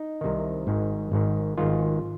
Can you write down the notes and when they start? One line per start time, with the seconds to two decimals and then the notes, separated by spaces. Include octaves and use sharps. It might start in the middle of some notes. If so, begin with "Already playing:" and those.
Already playing: D#4
0.21 C2 C3 D#3
0.67 G#1 G#2 D#3
1.12 G#1 G#2 D#3
1.57 G#1 G#2 D#3 F4